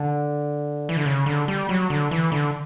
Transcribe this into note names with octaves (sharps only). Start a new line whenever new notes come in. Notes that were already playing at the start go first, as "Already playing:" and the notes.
Already playing: D3
E3
D3
C#3
D3
G3
F#3
D3
E3
D3